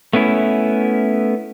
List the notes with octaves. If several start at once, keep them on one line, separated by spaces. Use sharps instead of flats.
A3 B3 C#4 E4